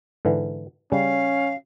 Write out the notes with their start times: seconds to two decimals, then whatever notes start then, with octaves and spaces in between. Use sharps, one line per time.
0.25 G#2 D3 E3
0.92 C#3 G3 C#4 F5